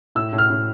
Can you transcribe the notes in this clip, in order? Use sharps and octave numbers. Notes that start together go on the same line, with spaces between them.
A2 E6
A2
F6
A2